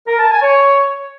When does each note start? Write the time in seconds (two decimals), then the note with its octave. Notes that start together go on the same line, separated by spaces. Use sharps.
0.07 A#4
0.19 A5
0.31 G#5
0.42 C#5